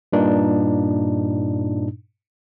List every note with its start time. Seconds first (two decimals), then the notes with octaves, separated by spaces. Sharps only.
0.13 G2 A#2 D4 D#4